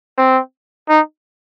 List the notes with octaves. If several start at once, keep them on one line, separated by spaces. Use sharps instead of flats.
C4
D#4